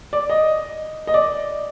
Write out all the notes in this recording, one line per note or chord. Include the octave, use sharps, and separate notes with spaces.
D5
D#5
D#5
D5